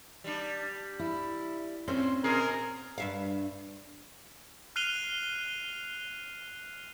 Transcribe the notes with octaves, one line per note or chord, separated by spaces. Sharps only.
G3 D4
E4
A2 C4 C#4 C5
A#2 G#4 A#4
G2 E5 F5
F6 F#6 C7 D#7 F7 G7